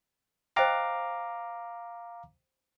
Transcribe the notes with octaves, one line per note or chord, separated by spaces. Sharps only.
C5 D#5 F5 G5 A#5 D6